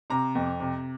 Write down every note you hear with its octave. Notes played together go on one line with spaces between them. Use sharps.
C3 A#5
F2
C3